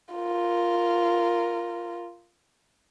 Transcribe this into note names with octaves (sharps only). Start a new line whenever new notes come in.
F4 A#4